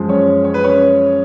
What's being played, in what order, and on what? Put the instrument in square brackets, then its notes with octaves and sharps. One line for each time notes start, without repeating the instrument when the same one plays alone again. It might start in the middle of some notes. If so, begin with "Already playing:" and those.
Already playing: [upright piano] F#2 F3 G#3
C#4 C#5
C#5
B4
C#4 C#5